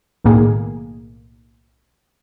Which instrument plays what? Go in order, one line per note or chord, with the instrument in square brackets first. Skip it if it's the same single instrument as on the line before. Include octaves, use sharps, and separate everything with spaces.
[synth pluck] B1 A2 D#3 A#3 G#4